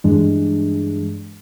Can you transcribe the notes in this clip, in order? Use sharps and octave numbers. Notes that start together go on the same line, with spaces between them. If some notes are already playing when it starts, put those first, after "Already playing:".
G2 E3 G#3 D4